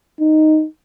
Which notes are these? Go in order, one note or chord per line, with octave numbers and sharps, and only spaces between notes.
D#4